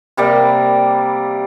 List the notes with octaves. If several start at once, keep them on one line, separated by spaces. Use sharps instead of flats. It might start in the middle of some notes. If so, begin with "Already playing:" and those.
C3 G3 A#3 D5